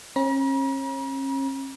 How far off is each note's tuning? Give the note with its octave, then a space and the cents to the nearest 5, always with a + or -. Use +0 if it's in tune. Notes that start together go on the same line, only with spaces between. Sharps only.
C#4 -40 A#5 +45